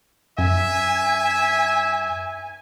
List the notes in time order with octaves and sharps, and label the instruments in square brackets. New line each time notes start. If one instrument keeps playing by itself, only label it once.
[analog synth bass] F#2 [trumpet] E5 [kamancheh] G#5